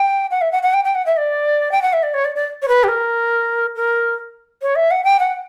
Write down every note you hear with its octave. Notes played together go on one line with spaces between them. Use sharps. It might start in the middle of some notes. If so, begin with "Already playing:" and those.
Already playing: G5
F#5
E5
F#5
F#5
G5
G5
F#5
E5
D5
G5
F#5
E5
D5
C#5
D5
D5
C#5
B4
G4
A#4
A#4
C#5
E5
F#5
G5
F#5